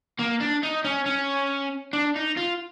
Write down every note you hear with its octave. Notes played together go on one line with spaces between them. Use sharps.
A#3
D4
D#4
C#4
C#4
D4
D#4
F4